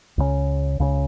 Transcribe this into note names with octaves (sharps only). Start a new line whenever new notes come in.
C#2 C#3 G3 C#4
C#2 C#3 G3 C#4